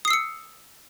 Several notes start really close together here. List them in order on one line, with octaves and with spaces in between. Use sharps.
D#6 C7 E6 C#7